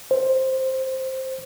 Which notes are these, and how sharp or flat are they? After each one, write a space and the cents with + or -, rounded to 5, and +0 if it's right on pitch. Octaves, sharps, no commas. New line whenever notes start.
C5 +5